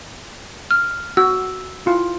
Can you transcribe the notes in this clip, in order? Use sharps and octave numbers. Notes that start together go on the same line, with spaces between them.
F6
F#4 E6
E4 F4